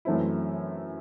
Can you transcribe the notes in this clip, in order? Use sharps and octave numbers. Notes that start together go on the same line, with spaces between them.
F#2 E3 A3 C4 E4